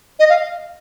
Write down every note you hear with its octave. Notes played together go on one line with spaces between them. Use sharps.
D#5
F5